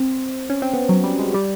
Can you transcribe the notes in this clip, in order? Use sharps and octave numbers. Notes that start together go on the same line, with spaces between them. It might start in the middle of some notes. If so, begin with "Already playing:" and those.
Already playing: C4
C#4
C4
B3
F#3
G3
G#3
G3